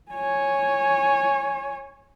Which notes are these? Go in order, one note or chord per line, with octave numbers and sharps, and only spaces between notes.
C#5 G#5